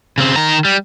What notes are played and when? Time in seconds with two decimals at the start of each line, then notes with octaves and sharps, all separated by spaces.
0.18 C#3 C4
0.36 D#3 A#5
0.65 G3